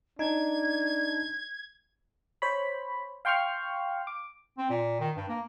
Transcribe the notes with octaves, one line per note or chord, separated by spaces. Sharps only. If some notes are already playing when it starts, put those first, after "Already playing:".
D4 D#4 G#6
C5 C#5 B5
F5 G5 C6 C#6 F6
D6
C4
A#2
D#3
G2
A#3